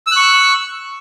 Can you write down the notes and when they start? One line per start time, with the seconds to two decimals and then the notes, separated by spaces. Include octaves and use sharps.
0.07 E6
0.12 F#6
0.16 C#6